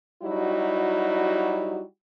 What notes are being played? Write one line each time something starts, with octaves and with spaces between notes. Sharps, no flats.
F#3 G3 D#4 E4 F#4 G4